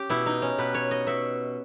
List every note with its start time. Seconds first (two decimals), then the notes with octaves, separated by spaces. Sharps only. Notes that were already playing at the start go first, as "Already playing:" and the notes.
Already playing: C#4 G4
0.10 B2 E4
0.26 D#4
0.42 C#4
0.58 B2 B4
0.74 C#5
0.91 D#5
1.07 B2 E5